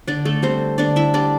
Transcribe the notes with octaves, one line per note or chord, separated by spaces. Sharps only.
D3 D4 D5
A3 A4
G3 C4 C5
D3 D4 D5
E4 E5
G3 D4 D5